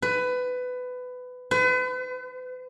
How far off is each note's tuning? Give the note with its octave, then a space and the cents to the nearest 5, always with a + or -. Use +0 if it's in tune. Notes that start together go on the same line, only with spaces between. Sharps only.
B4 +20
B4 +40